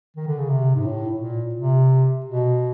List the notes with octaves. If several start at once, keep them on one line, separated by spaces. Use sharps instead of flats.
D#3
D3
C#3
C3
G#2
A2
A#2
C3
B2